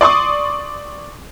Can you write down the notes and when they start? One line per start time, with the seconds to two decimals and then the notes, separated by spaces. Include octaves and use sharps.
0.01 D5 C6 C#6 D#6